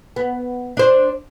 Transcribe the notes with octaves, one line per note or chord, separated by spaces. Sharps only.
B3
D4 C5